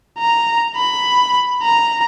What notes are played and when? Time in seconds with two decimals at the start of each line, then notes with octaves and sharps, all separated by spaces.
0.18 A#5
0.76 B5
1.63 A#5